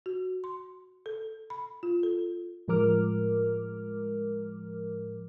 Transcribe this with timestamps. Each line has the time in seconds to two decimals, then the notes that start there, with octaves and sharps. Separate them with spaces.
0.06 F#4
0.44 C6
1.06 A4
1.50 B5
1.83 F4
2.03 A4
2.68 A2 F3 G#3 A#4 D6 F6